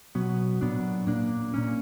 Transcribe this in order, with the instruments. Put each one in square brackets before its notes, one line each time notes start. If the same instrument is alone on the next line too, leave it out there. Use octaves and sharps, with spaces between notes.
[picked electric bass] B2 F#3 B3
A#2 F#3 B3 D4
A#2 A#3 D4
A#2 A#3 C#4